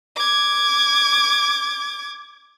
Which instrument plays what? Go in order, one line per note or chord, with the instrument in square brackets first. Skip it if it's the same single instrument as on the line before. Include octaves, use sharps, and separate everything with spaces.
[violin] D6 G#6